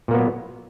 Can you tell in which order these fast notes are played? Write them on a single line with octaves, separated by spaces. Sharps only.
A#2 A#3 B3 F#3